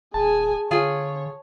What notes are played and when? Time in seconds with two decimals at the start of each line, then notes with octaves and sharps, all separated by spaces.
0.14 D#1 G#4 G#5 A5
0.71 D3 F4 G#4 C#5 G#5